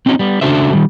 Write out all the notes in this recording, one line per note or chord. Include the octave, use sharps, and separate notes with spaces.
C4 C#4 D#4 F#4
G3 B3
C#3 D4 F#4 A4 C5 E5
D#3 G3